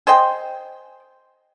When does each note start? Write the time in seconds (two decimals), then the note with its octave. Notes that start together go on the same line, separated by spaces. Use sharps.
0.07 G#4 C5 D#5 G5